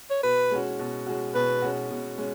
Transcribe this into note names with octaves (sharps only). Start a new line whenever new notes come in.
C#5
B2 B4
G#3 C#4 F#4
B2
G#3 C#4 F#4
B2 B4
G#3 C#4 F#4
B2
G#3 C#4